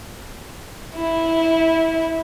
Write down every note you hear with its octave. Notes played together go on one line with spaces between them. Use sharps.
E4